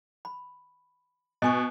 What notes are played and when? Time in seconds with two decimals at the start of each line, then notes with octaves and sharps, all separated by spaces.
0.25 B5
1.42 B2 D#5 G#5 C#6